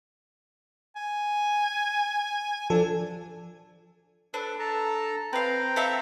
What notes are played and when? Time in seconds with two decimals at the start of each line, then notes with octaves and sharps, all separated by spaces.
0.96 G#5
2.70 F3 D4 A4
4.34 D4 A4 B4
4.59 A4 A5 A#5
5.33 C4 B4 F5 G5 A#5
5.76 A4 E5 F5